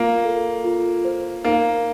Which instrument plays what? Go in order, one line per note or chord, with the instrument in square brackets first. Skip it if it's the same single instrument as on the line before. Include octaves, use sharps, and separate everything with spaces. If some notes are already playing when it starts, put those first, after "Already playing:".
Already playing: [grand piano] A#3 [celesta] F4
[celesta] A4
F4
C5
[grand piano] A#3 [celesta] D#4